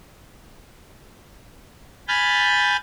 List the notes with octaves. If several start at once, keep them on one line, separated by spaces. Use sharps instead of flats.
G#5 B5 F6 G6 A6